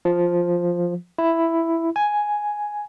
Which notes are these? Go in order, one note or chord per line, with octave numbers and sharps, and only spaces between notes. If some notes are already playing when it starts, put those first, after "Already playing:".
F3
E4
G#5